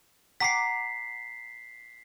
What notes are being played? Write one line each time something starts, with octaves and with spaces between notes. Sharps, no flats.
F#5 A#5 D6 B6 C7